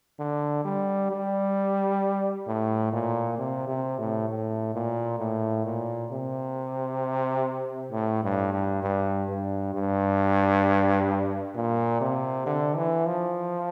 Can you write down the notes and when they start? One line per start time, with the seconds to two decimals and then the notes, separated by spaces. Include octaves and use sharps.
0.20 D3
0.65 G3
1.11 G3
2.48 A2
2.92 A#2
3.38 C3
3.68 C3
3.98 A2
4.29 A2
4.75 A#2
5.20 A2
5.65 A#2
6.11 C3
7.92 A2
8.23 G2
8.53 G2
8.83 G2
9.29 G2
9.74 G2
11.56 A#2
12.01 C3
12.46 D3
12.76 E3
13.06 F3